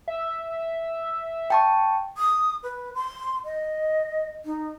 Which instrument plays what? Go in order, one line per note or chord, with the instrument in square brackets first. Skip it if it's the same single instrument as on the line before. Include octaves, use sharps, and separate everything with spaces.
[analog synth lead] E5
[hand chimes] G5 A5 C#6
[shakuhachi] D#6
B4
C6
D#5
D#4